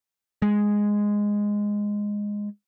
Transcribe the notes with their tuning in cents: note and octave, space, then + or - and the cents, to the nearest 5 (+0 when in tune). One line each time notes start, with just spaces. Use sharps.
G#3 -5